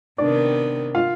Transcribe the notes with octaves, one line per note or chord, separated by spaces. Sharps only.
C3 D#3 B3 D4 D5
F4 F5